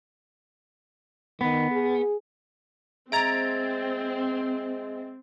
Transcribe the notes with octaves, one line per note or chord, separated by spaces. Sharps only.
D#3 B3
G#4
G#3 C4 E5 A#5 G#6 A6 D7